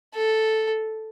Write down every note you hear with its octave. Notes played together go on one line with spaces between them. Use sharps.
A4